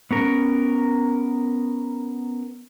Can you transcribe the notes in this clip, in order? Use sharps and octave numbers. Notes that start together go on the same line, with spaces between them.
B3 C#4 A#4